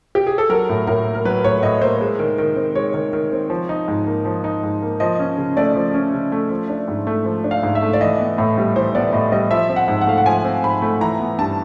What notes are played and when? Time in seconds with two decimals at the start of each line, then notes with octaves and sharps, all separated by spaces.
0.15 G4
0.27 G#4
0.38 A4
0.49 F#3 A#4
0.69 A2
0.87 A2 A#4
1.06 A#3
1.15 A#4
1.25 F#3 B4
1.44 A2 C#5
1.63 A2 D#5
1.81 A#3 C5
2.01 G#3
2.19 D#3
2.38 D#3
2.56 C4
2.75 G#3 C#5
2.94 D#3
3.13 D#3
3.32 C4
3.50 F3
3.69 D#4
3.88 G#2
4.07 A#3
4.25 F3
4.44 D#4
4.63 G#2
4.82 A#3
5.00 F3 D#5
5.19 C#4
5.38 C#3
5.57 A3 D5
5.75 F3
5.94 C#4
6.14 C#3
6.32 A3
6.50 F3
6.69 D4
6.88 G#2
7.07 A3
7.25 F3
7.44 D4
7.51 F5
7.63 G#2
7.75 E5
7.82 A3
7.93 D5
8.01 E3 D#5
8.20 B3
8.38 A2
8.58 G3
8.76 E3 C5
8.95 B3 D5
9.13 A2 D#5
9.32 G3 D#5
9.51 F3 E5
9.69 C4
9.76 F#5
9.88 G#2
10.01 F#5
10.07 A3 F5
10.18 F#5
10.26 F3 G#5
10.45 C4
10.63 G#2 B5
10.82 A3
11.01 E3 A#5
11.20 B3
11.39 G2 A5